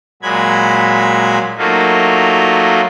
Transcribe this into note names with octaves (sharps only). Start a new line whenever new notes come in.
A#2 F#3 G#3 B5 G#6
F#3 A3 A#3 D#4 F4 F#4